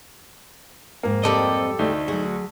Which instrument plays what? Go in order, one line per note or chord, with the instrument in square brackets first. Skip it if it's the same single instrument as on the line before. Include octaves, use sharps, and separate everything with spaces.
[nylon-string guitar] F2 G#2 [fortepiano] A#3
[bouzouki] G3 A4 D5 [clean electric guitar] C4 D#5
[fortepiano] D2 [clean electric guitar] A3 D#4
[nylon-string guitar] F#3 G#4 [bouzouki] F#4